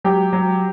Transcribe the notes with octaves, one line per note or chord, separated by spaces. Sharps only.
F#3 G4
F#3